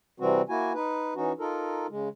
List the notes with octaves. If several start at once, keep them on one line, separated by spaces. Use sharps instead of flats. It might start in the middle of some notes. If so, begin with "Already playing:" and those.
C3 E3 G3 C4 F#4
A#3 E4 F#4 G#5
D#4 B4
E3 C#4 D#4 F#4
D#4 F4 A4 A#4
C#3 G#3